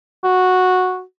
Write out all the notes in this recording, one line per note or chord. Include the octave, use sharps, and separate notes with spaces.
F#4